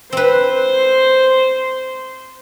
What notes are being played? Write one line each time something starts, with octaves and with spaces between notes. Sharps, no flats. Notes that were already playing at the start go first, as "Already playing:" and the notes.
C4 B4 C5